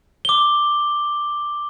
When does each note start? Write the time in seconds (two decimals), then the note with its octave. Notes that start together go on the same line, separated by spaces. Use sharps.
0.25 D6 G7